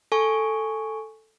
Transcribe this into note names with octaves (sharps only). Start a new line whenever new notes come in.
A4 G#5 C#6